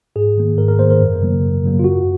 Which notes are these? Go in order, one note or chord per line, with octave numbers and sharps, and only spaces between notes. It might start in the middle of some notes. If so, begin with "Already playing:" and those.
G#2 G#4
D#3 A#3
G#2 A#4
A#4
D#3 A#3 C5
A#4
F#2
C#3 F#3 A#3
F#2
C#3 F#3 A#3
F4
F#2 F#4